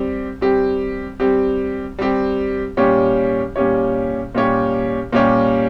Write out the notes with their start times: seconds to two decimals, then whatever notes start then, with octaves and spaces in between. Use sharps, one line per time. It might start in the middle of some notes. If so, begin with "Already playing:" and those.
Already playing: G3 C4 G4
0.41 G3 C4 G4
1.20 G3 C4 G4
1.98 G3 C4 G4
2.77 A#2 G3 C#4 G4 C#5
3.56 A#2 G3 C#4 G4 C#5
4.35 A#2 G3 C#4 G4 C#5
5.13 A#2 G3 C#4 G4 C#5